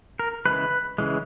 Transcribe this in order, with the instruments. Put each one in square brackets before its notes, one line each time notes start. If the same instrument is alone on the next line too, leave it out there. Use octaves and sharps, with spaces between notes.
[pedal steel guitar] A#4
C#3 E3 G#3 B4
C#3 E3 G#3